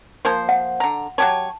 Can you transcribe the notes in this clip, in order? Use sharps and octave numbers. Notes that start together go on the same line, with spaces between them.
F3 A#3 C5
F#5
D3 A#5
F#3 G4 C#5 A5